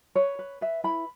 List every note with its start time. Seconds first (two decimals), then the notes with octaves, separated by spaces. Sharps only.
0.15 B4 C#5
0.39 B4
0.61 B4 E5
0.84 E4 B5